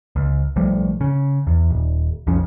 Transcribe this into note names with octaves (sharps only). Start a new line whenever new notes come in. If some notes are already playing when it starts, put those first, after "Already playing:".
C#2
B1 F3 G3 A3
C#3
E2
D#1
B1 F2 F3 C#4